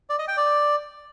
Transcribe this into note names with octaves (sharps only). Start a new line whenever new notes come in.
D5
D#5
G5
D5